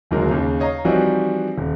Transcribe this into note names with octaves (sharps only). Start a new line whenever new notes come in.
D1 D#2 F#3 G#3 A#4
D#2 C#3
C#5 D#5 F5 A#5
E3 F3 G3 C4 D#4 F#4
D#1